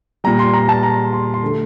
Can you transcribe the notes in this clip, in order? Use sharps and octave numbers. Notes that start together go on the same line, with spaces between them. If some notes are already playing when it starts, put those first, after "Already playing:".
A#2 G3 A#5
C6
A#5
A5
A#5
C6
C6
D3 A3